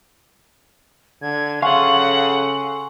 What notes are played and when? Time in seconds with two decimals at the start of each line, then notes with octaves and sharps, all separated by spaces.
1.22 D3 G#6
1.62 C#3 A4 F5 F#5 G#5 C6 C#6